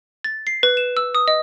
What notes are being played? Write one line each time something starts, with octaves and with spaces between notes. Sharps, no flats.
A6
C7
B4
E7
E6
D#6
D#5